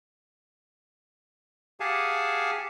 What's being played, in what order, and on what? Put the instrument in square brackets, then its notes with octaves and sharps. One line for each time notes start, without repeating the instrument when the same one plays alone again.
[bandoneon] G4 G#4 F5 F#5 G#5 A5